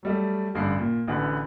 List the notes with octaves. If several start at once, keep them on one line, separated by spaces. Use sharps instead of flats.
F#3 G3 A3
A1 G2 D3 C7
A#2
A1 D3 E3 F#4 B4